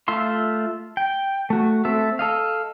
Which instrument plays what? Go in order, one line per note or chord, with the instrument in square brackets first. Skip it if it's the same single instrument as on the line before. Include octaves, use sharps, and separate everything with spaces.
[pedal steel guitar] A3 F4 E5 C6
G5
A3 F#4
A3 C4 A4 E5
A4 D#5 F5